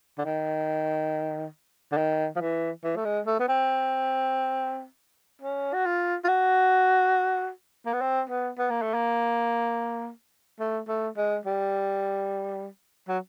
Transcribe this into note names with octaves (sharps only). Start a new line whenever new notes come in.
D3
D#3
D3
D#3
F3
E3
E3
A3
G#3
A3
B3
C4
C#4
F#4
F4
F4
F#4
A#3
B3
C4
B3
B3
A#3
A3
A#3
A3
A3
G#3
G3
F#3